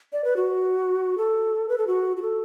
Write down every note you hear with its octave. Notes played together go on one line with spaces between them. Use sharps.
D5
B4
F#4
A4
B4
A4
F#4
F#4
A4